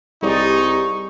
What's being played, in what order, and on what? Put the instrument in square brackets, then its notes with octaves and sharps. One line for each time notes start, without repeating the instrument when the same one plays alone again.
[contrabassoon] C2 [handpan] G3 G#4 D5 [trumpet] D#4 [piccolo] C#6